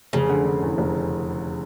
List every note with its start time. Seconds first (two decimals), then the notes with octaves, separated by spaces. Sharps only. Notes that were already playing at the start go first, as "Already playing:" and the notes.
0.13 F1 C#3
0.30 D3
0.46 D3
0.62 E2
0.78 F1